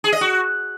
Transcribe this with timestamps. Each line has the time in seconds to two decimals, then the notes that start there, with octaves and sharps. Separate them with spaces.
0.04 G#4
0.12 D#5
0.21 F#4